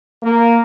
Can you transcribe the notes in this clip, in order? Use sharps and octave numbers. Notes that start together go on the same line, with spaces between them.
A#3